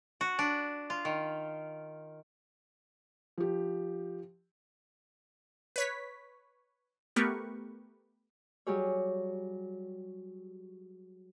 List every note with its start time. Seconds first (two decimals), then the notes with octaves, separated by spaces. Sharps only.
0.21 F#4
0.39 D4
0.90 F4
1.05 D#3
3.38 F3 G4
5.76 B4 C#5 B6
7.16 A3 B3 G4 A#4 B4 C#6
8.67 F#3 G3 G4 G#4 C#5